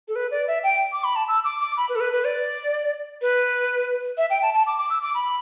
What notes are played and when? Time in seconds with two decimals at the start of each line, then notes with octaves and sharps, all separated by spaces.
0.08 A4
0.16 B4
0.31 D5
0.47 E5
0.63 G5
0.92 D6
1.04 B5
1.16 A5
1.28 E6
1.45 D6
1.60 D6
1.77 B5
1.89 B4
1.95 A4
2.00 B4
2.13 B4
2.25 D5
3.22 B4
4.18 E5
4.30 G5
4.42 A5
4.54 A5
4.67 D6
4.78 D6
4.90 E6
5.02 D6
5.14 B5